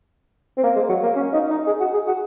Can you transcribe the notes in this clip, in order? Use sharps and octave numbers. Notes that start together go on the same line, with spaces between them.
C4
A#3
G#3
F#3
A#3
C#4
D#4
D#4
G#4
F#4
G#4
F#4